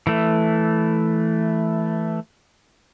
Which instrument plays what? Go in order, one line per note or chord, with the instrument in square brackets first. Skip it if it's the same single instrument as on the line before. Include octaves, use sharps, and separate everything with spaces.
[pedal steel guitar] E3 A3